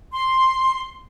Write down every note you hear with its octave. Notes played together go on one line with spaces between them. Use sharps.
C6